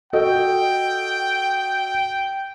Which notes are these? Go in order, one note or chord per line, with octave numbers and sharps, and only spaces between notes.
F#4 A4 D#5 G5